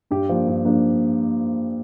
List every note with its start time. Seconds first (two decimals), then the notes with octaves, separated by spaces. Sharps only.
0.11 G2 G4
0.29 F3 A#3 D4
0.47 G2
0.65 F3 A#3 D4